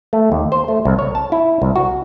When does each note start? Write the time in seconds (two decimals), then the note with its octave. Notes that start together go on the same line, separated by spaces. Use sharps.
0.13 A3
0.32 D#2
0.52 C5
0.68 A3
0.85 C2
0.99 C#5
1.15 A5
1.32 E4
1.62 C2
1.76 F#4